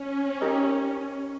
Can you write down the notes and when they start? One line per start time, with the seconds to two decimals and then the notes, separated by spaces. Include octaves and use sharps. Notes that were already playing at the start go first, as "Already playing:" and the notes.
Already playing: C#4
0.41 D#4 G4 A#4 D#5